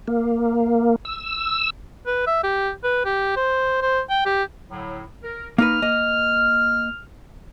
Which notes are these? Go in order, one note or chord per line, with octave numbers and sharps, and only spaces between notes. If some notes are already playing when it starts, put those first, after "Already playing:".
A#3
E6
B4
E5
G4
B4
G4
C5
C5
G5
G4
A2 D3 F#3
A#4
A#3 D#4 B4 F6
A#3 D#5